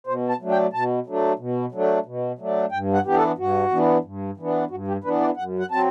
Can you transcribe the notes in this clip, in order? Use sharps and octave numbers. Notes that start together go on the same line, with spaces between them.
B2 C5
A5
F#3 A3 D4
G5
B2 A5
F#3 A3 D4
B2
F#3 A3 D4
B2
F#3 A3 D4
G2 G5
F#5
E3 B3 D4 G4
A4
G2 F#4
E3 B3 D4
G2
E3 B3 D4
G2 F#4
G4
E3 B3 D4 B4
D5
F#2 F#5
F#5
F#3 C4 A5